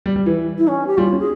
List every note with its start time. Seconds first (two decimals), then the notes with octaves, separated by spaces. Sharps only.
0.06 G3
0.16 G3
0.26 E3
0.58 E4
0.67 C#4
0.87 G4
0.97 G3 F4
1.13 C#4
1.19 G#4